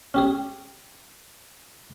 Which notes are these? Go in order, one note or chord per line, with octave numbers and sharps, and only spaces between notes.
C#4 G4 G#4